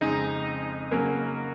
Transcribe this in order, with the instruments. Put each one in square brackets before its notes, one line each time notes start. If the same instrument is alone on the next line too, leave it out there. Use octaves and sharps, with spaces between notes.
[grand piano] F2 C#3 G#3 C4 [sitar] D#4
[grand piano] C#3 F#3 A#3 C#4